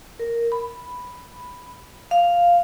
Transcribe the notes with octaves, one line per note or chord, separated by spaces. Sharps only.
A#4
B5
F5